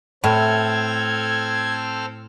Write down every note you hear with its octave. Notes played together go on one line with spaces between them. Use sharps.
A2 C4 A4 F6 G#6